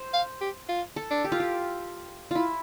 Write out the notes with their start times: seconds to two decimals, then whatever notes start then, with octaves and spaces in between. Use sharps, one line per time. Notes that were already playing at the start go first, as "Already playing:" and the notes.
Already playing: C5
0.13 F5
0.41 G4
0.69 F4
0.96 A4
1.11 D4
1.25 G4
1.32 F4
1.40 G4
2.31 E4 F4